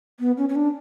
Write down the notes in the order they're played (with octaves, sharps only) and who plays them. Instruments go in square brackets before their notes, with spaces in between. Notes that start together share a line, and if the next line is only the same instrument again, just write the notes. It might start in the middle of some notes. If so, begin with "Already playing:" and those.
[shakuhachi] B3
C#4
C#4
D4